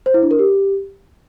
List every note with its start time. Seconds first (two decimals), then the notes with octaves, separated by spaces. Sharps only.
0.06 C5
0.14 E4
0.23 D4
0.31 A#4
0.39 G4